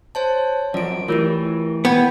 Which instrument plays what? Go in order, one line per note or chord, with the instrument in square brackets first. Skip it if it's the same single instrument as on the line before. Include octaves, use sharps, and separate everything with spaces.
[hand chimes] C5 C#5 A5
[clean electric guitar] F#2 F3 [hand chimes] D5 D7
[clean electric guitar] E3 [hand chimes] A3 E4 G4 [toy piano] F4 A#4 C#5
[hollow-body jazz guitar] B3 [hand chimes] G5 G6 G#6